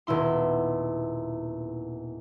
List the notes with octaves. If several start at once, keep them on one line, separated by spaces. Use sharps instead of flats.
D#1 B2 E4 C6